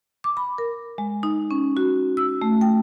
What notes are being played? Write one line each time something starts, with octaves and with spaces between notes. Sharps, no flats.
D6
B5
A#4
G#3
D#4
C#4
F#4
E6
A3
G5